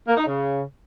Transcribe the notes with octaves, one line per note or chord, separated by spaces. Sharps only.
A#3
D#4
C#3